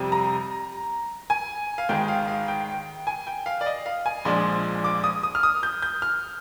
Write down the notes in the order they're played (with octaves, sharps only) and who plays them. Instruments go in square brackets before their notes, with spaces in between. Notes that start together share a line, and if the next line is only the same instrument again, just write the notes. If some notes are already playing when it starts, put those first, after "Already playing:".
Already playing: [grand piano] F2 C3 G3 C4
A#5
G#5
F5
G#1 G#2 D#3 G#3 G5
F5
F5
G5
G#5
G5
F5
D5
D#5
F5
G#5
A#1 A#2 F3 G#3 D4 C6
D6
D#6
D#6
F6
D#6
G6
G6
F6